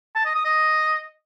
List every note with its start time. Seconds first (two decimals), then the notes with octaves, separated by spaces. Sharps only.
0.16 A5
0.25 D#5
0.35 D#6
0.45 D#5